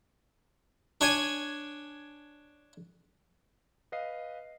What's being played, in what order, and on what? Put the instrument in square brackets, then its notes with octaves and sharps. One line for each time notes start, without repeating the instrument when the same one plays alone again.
[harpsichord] D4 C#5 G#5
[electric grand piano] B4 D#5 F5 C7